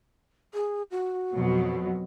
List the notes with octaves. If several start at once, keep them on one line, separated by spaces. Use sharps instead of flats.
G#4
F#4
F2 B2 F#3